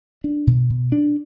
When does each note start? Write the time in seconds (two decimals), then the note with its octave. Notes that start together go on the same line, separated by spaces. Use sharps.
0.24 D4
0.47 B2
0.70 B2
0.92 D4